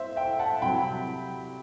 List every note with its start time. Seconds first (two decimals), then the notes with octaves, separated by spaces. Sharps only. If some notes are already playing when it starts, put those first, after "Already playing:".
Already playing: C5 E5
0.16 E5 G5
0.39 F#5 A5
0.62 C3 F#3 G5 B5